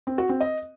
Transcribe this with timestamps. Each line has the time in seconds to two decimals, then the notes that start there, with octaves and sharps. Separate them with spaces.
0.07 C4
0.18 F#4
0.29 C4
0.41 D#5